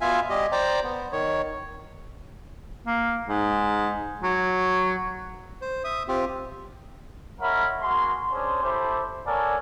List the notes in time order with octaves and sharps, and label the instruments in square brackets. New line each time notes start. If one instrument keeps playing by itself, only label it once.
[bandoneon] B2 B3 F4 E5 F5 G#5
G3 G4 D#5
C5 D5 G5 A#5 D6
B3
D#3 C#5
[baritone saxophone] A#3
G#2
F#3
[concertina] C5
E5 D#6
C4 F4 G4
[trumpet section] G#3 A#4 C#5 E5 F#5 B5
A#3 F#4 G#4 C6
C#4 D4 G#4 C5
E4 G4 A4 C5
A4 A#4 C#5 D5 F#5 G#5